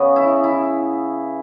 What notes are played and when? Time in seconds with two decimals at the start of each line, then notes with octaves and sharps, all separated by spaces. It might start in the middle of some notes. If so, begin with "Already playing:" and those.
Already playing: C#3 B3
0.16 E4
0.44 E4